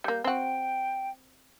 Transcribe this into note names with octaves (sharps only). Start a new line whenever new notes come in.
G3 A#3 G6
C4 F#4 G5